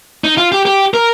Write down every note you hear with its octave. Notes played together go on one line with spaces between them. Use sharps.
D#4
F4
G4
G4
A#4